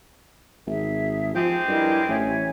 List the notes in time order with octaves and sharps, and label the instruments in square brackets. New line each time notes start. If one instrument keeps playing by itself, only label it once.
[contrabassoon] G#1 [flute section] G#4 E5
[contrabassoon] F3 [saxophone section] G#3 C4 G4
[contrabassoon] G2 [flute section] E4 A#4 D#5
[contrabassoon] A1 [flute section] C#5 E5 G#5